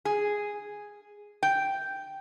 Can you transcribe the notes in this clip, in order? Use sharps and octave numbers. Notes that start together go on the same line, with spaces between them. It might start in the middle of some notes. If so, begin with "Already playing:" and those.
G#4
G5